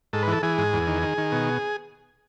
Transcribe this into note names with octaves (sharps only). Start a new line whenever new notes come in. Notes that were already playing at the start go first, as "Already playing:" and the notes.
G#2 A4
B4
E3 A4
E3 G#4
G#2
E2
D#3
D#3
D#3
B2